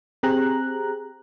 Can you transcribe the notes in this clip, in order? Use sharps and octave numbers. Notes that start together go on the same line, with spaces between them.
C4 G4 G#4 A#5 F#6